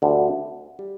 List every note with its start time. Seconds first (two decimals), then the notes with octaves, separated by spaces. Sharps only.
0.02 D2 D3 G3
0.79 G3